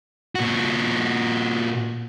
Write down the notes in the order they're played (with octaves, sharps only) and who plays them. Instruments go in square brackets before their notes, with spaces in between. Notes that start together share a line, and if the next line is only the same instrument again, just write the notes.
[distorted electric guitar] A#2 F#4